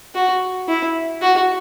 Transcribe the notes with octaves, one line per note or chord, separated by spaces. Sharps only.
F#4
E4
F#4